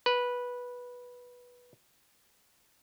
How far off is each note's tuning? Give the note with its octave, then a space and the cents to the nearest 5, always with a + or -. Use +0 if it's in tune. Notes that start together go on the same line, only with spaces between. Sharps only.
B4 -10